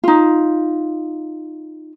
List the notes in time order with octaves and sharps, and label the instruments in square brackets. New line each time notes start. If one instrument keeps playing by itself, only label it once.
[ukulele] D#4 F4